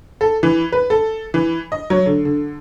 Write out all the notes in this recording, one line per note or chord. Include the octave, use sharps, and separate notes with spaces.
A4
E3
B4
A4
E3
D#5
F#3
D3
D3